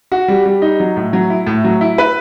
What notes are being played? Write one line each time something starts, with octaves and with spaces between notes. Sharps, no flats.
F#4
G3
G3
D#4
F#3
A2
F#3
E4
A2
F#3
E4
B4